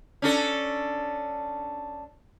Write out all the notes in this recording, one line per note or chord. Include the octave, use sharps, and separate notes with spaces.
C#4 D4 A4